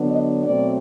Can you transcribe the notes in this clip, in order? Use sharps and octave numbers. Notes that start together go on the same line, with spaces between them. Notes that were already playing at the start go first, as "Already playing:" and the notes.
Already playing: D3 F#3 B3 D4
D#5
B2 F#3 A3 C4 D5